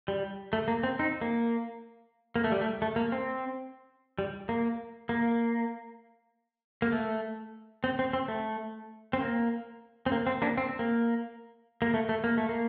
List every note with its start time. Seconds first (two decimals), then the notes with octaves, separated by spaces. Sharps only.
0.08 G3
0.53 A3
0.68 A#3
0.83 C4
0.99 C4 D#4
1.21 A#3
2.36 A#3
2.44 A3
2.52 G3
2.61 A3
2.82 A3
2.96 A#3
3.12 C4
4.19 G3
4.49 A#3
5.09 A#3
6.82 A#3
6.92 A3
7.84 C4
7.99 C4
8.13 C4
8.28 A3
9.13 C4
9.20 A#3
10.06 C4
10.12 A#3
10.27 C4
10.42 A#3 D4
10.58 C4
10.79 A#3
11.82 A#3
11.94 A3
12.09 A3
12.24 A#3
12.37 A3
12.49 A#3